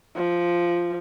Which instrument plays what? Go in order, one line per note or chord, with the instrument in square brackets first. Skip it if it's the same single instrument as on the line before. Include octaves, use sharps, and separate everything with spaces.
[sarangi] F3